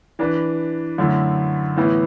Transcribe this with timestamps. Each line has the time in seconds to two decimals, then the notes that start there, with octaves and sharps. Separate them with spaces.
0.19 E3 D4 B4
0.98 F#2 D3 A3 E4
1.76 A2 E3 B3 E4